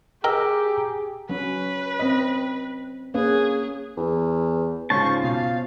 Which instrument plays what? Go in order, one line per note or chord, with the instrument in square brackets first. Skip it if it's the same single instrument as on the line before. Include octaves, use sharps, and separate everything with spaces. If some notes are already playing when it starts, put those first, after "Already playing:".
[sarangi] G4 [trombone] G#4 [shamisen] A#4 D#5 G5 [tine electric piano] A#5 E6
[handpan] F#3 C#4 [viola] B4
[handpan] C4 D#5
[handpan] A#3 C#4 B4 [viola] G#4
[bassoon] E2
[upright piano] G#2 C#3 [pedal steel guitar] F4 C5 A5 [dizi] C#6
[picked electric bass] B2 [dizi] F5